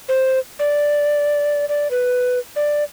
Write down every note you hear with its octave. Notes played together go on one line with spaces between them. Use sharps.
C5
D5
D5
B4
D5